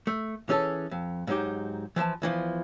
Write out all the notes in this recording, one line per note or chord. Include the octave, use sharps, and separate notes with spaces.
A3
E3 C#4 G#4 A4
F2
G#2 F#3 D#4 G4
E3 F3 F5 A5
E2 E3 F3